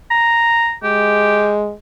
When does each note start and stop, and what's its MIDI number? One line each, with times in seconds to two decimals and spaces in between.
0.11 0.74 82
0.83 1.73 56
0.83 1.52 67